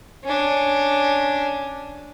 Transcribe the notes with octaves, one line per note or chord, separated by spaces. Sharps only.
C#4 D4